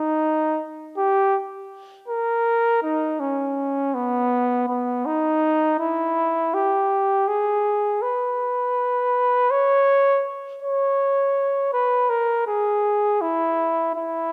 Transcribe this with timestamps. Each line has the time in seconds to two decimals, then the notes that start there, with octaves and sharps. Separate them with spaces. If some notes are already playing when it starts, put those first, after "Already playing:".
Already playing: D#4
0.97 G4
2.08 A#4
2.83 D#4
3.20 C#4
3.94 B3
4.68 B3
5.06 D#4
5.79 E4
6.54 G4
7.28 G#4
8.02 B4
9.51 C#5
10.62 C#5
11.73 B4
12.10 A#4
12.47 G#4
13.21 E4
13.95 E4